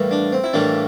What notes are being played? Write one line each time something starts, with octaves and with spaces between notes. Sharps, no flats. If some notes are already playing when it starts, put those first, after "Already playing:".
Already playing: A2 E3 G3 A#3
D4
C4
E4
A2 E3 G3 A#3 D4